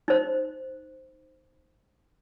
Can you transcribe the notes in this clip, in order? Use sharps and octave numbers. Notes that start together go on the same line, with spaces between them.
D#4 C5